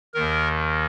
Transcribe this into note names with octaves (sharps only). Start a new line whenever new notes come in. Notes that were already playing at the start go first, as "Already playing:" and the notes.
D#2 D#3 A#4